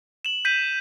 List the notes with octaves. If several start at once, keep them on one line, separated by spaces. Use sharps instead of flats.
E7 F#7
G6 B6 D#7